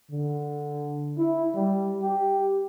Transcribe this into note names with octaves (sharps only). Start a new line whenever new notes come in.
D3
E4
G3
G4